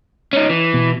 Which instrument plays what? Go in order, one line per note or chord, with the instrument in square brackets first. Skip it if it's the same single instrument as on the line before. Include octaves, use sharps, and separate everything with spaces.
[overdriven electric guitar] C#4 D#4
E3
[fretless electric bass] B2